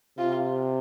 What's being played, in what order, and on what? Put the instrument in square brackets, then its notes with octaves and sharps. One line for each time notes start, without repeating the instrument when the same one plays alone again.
[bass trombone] C3 [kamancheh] F4